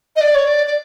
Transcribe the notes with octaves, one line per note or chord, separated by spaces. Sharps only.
D#5
D5
C#5
D5
D5